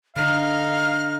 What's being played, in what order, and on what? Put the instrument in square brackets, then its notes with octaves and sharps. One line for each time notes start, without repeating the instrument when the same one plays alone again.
[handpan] D3 [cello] D#4 [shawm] F5 [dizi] F6